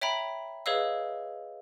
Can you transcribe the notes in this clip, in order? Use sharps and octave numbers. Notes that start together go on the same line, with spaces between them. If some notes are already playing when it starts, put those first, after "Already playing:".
C#5 E5 G5 A#5 B5
G#4 B4 C#5 D#5 F5 E6